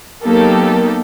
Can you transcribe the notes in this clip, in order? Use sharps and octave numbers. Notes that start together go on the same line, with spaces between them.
F#3 A#3 B3 D#4 G4 A4